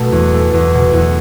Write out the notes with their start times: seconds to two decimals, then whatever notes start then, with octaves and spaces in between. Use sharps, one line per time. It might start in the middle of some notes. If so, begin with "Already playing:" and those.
Already playing: B2 A3
0.12 E2
0.33 A3
0.53 E2
0.74 B2
0.93 E2